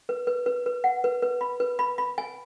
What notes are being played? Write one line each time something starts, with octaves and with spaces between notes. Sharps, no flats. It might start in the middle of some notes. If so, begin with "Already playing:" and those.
B4
B4
B4
B4
F#5
B4
B4
B5
B4
B5
B5
G#5